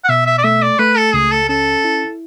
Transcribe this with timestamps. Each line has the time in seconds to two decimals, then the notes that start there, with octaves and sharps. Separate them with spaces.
0.04 F#5
0.09 B2 E5
0.26 E5
0.38 D5
0.44 A3 E5
0.62 D5
0.79 A3 B4
0.97 A4
1.14 C#2 G#4
1.31 A4
1.49 C#4 A4
1.84 E4